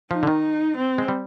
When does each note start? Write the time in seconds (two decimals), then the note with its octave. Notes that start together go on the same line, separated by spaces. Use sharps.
0.11 F3 D#4
0.23 D3
0.27 D#3
0.76 C4
0.98 G#3
1.08 G3